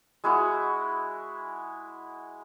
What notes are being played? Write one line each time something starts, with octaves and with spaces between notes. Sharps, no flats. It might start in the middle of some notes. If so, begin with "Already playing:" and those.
G#3 E4 F#4 D#5